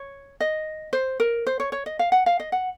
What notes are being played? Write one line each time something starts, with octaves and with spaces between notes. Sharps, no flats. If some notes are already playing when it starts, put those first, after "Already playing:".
Already playing: C#5
D#5
C5
A#4
C5
C#5
C#5
D#5
F5
F#5
F5
D#5
F#5